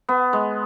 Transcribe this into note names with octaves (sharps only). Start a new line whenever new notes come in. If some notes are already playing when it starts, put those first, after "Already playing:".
B3
G#3